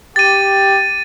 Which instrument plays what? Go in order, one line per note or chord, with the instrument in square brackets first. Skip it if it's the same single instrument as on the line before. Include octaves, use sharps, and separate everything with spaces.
[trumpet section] G4 [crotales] A6 D#7